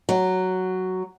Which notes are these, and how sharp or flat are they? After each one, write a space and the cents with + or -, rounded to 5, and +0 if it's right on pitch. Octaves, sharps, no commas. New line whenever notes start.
F#3 +5